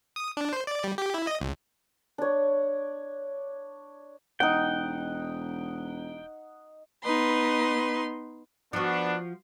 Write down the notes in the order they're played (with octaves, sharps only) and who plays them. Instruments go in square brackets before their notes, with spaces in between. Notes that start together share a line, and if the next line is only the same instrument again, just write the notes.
[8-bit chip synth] D#6
D4
C5
D5
G3
G4
E4
D#5
C#2
[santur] D4 C#5
[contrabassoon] E1 [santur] D#4 F#5 [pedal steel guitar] G5
[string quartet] B3 D#4 B4 C6
[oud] F3 F#4 [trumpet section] B3 D4